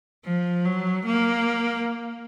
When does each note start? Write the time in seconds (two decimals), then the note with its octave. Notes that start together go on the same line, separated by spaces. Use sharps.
0.25 F3
0.65 F#3
1.06 A#3